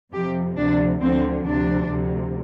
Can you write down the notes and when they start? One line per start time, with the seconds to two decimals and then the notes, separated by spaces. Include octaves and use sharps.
0.12 F2 C3 F3 G4
0.57 D2 C3 F3 D4
1.00 D2 D3 F3 C4
1.45 D2 C3 F3 D4
1.89 D2 C3 F3